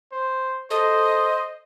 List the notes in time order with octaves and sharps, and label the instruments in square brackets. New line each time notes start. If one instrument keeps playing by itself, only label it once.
[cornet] C5
[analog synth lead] A4 [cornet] C5 [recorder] D#5